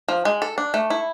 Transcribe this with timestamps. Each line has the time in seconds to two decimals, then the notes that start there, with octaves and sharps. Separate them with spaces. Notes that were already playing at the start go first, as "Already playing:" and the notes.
0.08 F3
0.25 G#3
0.42 A4
0.58 D4
0.74 A3
0.90 E4